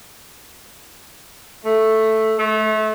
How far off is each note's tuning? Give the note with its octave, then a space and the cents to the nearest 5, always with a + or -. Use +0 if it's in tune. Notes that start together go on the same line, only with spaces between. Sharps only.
A3 +0
A3 -30